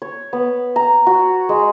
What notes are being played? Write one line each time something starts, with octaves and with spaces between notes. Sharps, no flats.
C#5
B3
A#5
F#4
G#3